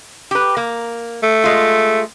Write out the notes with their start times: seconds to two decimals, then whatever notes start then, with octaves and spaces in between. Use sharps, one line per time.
0.31 G4 B4
0.57 A#3
1.23 A3
1.44 G#3 F4